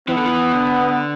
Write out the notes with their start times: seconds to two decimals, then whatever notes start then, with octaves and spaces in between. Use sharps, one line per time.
0.08 E3 B3
0.17 D3
0.26 E3
0.52 D3